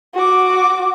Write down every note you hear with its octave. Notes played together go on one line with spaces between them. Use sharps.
F#4 D6